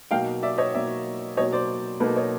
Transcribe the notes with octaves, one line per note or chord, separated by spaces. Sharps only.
B2 F#3 A#3 D#4 F5 G5
D5 E5
C#5 D#5
B2 F#3 A#3 D#4 D5 E5
B2 F#3 A#3 D#4 C#5 D#5
C5 D5
B2 F#3 A#3 D#4 A4 B4
C#5 D#5